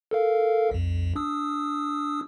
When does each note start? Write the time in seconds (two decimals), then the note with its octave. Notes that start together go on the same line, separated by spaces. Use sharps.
0.11 A4 A#4 F5
0.71 B1 F2
1.15 D4 D#6 E6